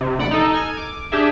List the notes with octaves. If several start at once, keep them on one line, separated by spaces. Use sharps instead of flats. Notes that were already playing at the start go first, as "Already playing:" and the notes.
C3
A#1 D5 F#5 B5 A6 C#7
D#4 A4
G#5 F6 G#6
D6
D4 G4 G#4 E5